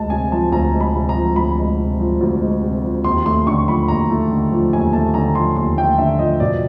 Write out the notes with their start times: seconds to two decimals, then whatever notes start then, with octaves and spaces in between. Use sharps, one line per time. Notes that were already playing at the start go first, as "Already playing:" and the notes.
Already playing: D2 G#3 A5
0.10 C3 G#5
0.32 F3 A5
0.52 D2 A#5
0.74 G#3
0.81 B5
0.95 C3
1.09 A#5
1.15 F3
1.36 D2 B5
1.58 G#3
1.78 C3
2.00 F3
2.21 D2
2.42 G#3
2.62 C3
2.84 F3
3.04 D#2 C6
3.25 A3 C6
3.46 D3 C#6
3.67 F3 B5
3.88 D#2 A#5
4.10 A3
4.30 D3
4.52 F3
4.73 D#2 G#5
4.93 A3 A5
5.14 D3 A#5
5.35 F3 C6
5.56 D#2 C6
5.78 A3 G5
5.98 D3 E5
6.19 F3 D#5
6.40 B2 D5